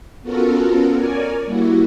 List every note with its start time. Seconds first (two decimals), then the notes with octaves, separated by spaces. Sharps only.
0.23 B3 C#4 F4 F#4 A4 A#4
0.94 A#4 C#5 D5 G#5
1.44 G3 A#3 E4 F#4